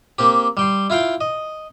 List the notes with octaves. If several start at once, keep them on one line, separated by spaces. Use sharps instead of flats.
A#3 C4 G4
G3 G5 C6
E4 F4 F5 G5
D#5